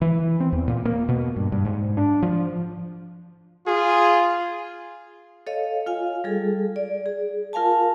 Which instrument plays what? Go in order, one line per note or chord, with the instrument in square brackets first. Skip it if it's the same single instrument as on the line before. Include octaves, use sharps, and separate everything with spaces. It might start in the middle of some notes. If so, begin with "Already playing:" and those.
[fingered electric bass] E3
C4
E2
A#2
A#3
B2
G2
G2
G#2
D4
F3
[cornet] F4 [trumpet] G#4
[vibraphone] A4 C#5 D#5 F5
F4 F5 G#5
G3 G#4 A4
D5
G#4
F4 A#4 F5 G#5 A5